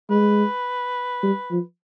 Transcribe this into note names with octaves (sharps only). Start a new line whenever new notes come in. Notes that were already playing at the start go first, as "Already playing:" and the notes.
G#3 B4
G3
F3